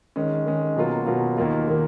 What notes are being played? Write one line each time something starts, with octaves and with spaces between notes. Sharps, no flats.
D#3 G#3 C#4
D#3 G#3 C#4
B2 F#3 A#3 F4
B2 F#3 A#3 F4
D#2 D#3 A#3 F4
D#3 A#3 F4